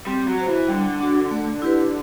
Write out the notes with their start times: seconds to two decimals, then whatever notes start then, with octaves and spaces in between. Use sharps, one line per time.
0.07 G3 C4
0.28 F#3
0.38 F#4 C5
0.48 E3
0.69 D3 G3
1.00 D4 F#4
1.31 A3
1.62 E4 G4 B4